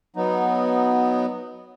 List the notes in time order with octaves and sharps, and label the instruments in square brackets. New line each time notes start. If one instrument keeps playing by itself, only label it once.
[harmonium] F#3 B3 D#4